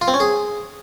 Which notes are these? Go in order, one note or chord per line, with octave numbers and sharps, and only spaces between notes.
F4
C4
C#4
G#4